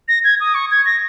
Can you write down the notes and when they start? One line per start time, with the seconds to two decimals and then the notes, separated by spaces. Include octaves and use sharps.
0.08 A#6
0.24 G#6
0.40 D#6
0.55 C#6
0.71 G#6
0.85 A#6